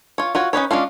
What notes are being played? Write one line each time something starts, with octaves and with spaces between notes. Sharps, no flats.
F4 C#5
F4 F#4 C#5
C#4 D#4 B4 C#5
G#3 C#4 D4 F4